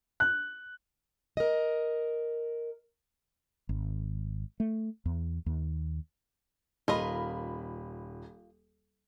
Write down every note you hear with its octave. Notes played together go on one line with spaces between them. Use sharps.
F#6
A#4 D#5
G#1
A3
E2
D#2
D#1 F4 A#4 D#5 B5